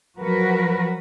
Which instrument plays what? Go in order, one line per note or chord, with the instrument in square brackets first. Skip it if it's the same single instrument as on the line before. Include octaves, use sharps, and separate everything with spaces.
[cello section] F3 F#3 F#4 A#4 B4